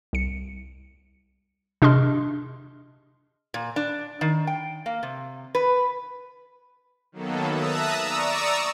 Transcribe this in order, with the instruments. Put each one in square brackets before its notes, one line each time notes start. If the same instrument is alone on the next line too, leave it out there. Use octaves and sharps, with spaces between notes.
[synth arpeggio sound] C2 C#7
C3 D4 G#4 D#5 C6 F6
[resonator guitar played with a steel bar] A#2
D4
D#3
G5
A#3
C3
B4
[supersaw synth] D#3 F#3 A#3 B3 A4
E5 A5 A#5 D#6 E6 F#6
D5 A#5 C#6 D#6 E6